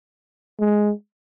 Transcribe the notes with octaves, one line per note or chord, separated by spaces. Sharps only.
G#3